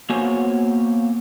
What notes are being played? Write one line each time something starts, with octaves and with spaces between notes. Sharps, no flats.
A#3 B3 F#4 C5 C#5 G#5